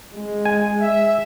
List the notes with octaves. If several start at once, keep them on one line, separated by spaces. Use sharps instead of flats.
G#3
G#5
E5